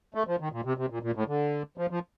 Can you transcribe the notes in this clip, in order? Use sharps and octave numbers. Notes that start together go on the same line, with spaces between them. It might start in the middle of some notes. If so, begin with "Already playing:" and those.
A3
F3
D#3
A#2
C3
C3
A#2
A#2
A2
D3
F3
F3